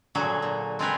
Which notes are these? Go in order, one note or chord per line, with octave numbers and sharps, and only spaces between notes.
A#2 D3 F#3 G#4
A#2
G#3 C4 F4 G#4 A#4 B4